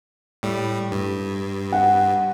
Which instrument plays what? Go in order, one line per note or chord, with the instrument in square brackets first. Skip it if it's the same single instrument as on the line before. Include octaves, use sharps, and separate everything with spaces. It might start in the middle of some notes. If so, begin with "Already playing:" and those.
[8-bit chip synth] A2 G3
G2
[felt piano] F#5